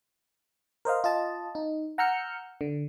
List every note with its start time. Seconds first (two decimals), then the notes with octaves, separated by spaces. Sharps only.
0.85 A#4 C5 D#5 F5
1.04 F4 D#5 A5
1.55 D#4
1.98 F#5 A#5 E6 F6 G6 C#7
2.61 D3